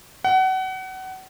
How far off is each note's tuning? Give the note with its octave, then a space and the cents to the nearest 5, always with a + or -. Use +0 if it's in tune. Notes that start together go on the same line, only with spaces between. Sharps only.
F#5 +30